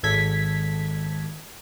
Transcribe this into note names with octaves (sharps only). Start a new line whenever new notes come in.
G#1 A4 G#6 B6